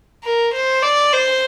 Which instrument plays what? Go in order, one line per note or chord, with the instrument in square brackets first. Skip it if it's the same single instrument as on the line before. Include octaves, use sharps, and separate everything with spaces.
[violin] A#4
C5
D5
C5